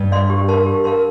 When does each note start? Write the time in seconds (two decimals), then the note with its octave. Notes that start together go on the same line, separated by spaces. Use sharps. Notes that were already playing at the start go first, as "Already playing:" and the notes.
Already playing: G2
0.12 D5 F5 C6
0.30 G4
0.48 A#4 F5 A5 C6
0.66 G4
0.84 A#4 F5 A5 C6